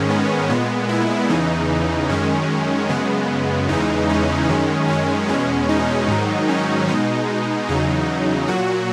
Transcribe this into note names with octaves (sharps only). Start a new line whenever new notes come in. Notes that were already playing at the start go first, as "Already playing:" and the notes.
Already playing: G#2 D#3 G#3 C#4
B3
A#2 G#3 B3
E4
E2 C#3 E3 D#4
F#2 D#3 G#3 C#4
F#2 C#3 G#3 B3
E2 C#3 E3 G#3 D#4
C#4
F#2 D#3 G#3
C#4
E2 B2 G#3 C#4
D#4
G#2 D#3 F#3
C#4
B2 G#3 D#4
E2 C#3 F#3 D#4
A#2 F#3 F#4